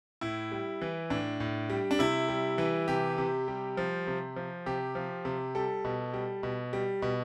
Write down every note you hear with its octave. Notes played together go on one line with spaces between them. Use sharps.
A2 E4
G3
E3
A2 D4
A2
G3
D4
C3 E4
G3
E3
C3 G4
C3
G3
F3
C3
F3
C3 G4
F3
C3
G3 A4
B2
G3
B2
G3
B2